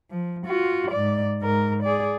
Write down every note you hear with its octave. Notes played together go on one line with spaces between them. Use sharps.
F3
F4 F#4
G#2 D5
G#2 A#4
G#4 D5